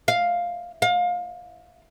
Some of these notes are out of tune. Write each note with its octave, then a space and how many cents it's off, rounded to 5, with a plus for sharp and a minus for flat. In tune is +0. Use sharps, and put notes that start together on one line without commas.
F5 +5
F5 +25